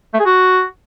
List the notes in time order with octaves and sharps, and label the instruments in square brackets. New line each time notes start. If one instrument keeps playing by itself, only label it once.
[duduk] A3
G#4
F#4